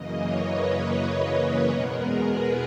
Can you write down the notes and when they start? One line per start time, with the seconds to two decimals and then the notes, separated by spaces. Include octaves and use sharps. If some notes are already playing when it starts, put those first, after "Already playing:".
Already playing: F#2 C#3 E3 A#3 D#5
0.19 C#5
0.50 B4
1.70 E2 B2 G#3 B3 A#4
2.00 G#4
2.29 B4